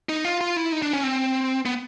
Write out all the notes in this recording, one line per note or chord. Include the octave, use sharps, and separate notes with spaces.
D#4
F4
F4
E4
D#4
D4
C#4
C4
B3